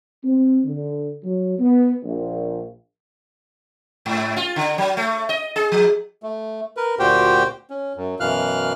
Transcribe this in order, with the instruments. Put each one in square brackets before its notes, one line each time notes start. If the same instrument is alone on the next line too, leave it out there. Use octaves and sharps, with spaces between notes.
[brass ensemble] C4
D3
F#3
B3
A#1
[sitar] G#2
F4
D3
F#3
A3
D#5
G#4
F3
[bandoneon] A3
A#4 B4
D2 A#2 F#4 G4 C5 G5
C#4
F#2
F#2 B2 E3 F5 F6 F#6